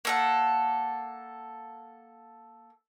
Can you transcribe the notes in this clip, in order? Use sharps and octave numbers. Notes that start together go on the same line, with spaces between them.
A#3 A4 F#5